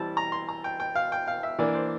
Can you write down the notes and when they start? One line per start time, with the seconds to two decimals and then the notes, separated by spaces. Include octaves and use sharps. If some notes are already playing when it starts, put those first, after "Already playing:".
Already playing: E3 G3 C4 E4 A5
0.17 A#5
0.32 C6
0.49 A#5
0.64 G5
0.80 G5
0.95 F5
1.12 G5
1.28 F5
1.43 E5
1.59 E3 A#3 D4 D5
1.75 C5